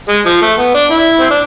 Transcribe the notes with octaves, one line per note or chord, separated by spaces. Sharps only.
G#3
F3
A3
B3
D4
E4
C4
D4